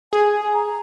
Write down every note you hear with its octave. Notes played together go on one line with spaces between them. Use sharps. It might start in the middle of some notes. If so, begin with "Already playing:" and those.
G#4 G#5
A#5